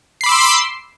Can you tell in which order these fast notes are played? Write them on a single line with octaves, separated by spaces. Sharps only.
C7 B5 D6 E6 C6